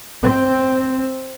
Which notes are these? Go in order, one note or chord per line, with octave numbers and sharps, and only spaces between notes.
C4